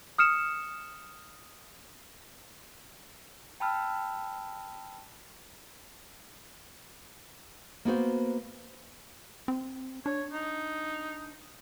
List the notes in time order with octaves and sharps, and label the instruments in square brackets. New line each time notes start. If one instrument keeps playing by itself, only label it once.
[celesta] D#6 F6 C#7 E7
[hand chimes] G5 A5 B5 E6 F6
[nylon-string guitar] A#3 B3 F#4 C5
[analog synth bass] C4
[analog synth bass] D4 [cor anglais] C#5
[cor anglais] D#4